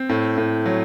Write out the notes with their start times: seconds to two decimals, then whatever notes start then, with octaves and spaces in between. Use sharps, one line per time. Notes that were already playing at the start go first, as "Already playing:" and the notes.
Already playing: C4
0.09 A2
0.38 A2
0.66 F#3